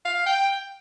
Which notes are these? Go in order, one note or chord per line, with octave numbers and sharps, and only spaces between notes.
F5
G5